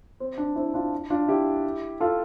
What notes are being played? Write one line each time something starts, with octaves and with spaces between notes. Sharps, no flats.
C4
D4
C4 E4
D4 F4
D4 F4
E4 G4
F4 A4